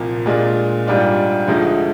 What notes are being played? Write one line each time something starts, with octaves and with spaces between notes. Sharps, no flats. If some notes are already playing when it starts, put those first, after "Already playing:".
Already playing: C2 A#2 F3 A#3
A#2 G#3 D4 F4
G#2 G3 D4 F4
D2 D3 F3 G#3 D#4